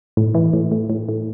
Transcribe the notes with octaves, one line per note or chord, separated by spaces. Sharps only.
A2
E3
A2
A2
A2
A2